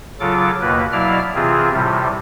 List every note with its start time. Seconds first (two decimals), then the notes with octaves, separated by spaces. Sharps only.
0.20 C#3 F#3 F4 A4 D6
0.61 D#2 B2 A#3 B4
0.92 B2 F#3 E4 D5 F5 F6
1.35 C3 E3 C4 F4 G#4
1.73 A2 C3 G3